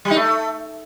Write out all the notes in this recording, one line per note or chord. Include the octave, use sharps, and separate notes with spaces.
G3
D#4
A3